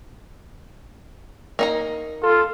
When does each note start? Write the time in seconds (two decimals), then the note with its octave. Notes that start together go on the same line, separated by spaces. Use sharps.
1.59 A#3 D#4 A#5
2.23 F4 A4